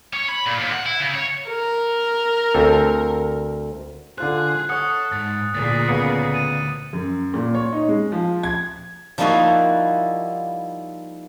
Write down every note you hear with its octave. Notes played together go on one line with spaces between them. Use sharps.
C#4
B5
A#2
D#2
F#5
E4
C#3
C#5
A#4
D2 C4 A4
D3 F4 G#4 C5 F#6
A4 C#5 F#5 D#6 C#7
G#2 A6
D2 A#2 G#4 A6
C#3 A#3 B3 C#7
A6 D#7
F#2
A#2
C#5
D#4
G#3
F3
G#6
F3 G3 A#3 D#4 E4 F#4